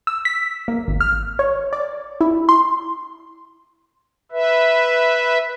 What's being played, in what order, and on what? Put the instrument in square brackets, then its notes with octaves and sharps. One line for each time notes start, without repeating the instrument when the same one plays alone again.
[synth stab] E6
B6
A#3
G#1
F6
C#5
D5
E4
C6
[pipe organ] B4 E5